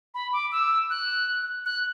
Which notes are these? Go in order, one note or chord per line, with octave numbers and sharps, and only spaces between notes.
B5
D6
E6
F#6
F#6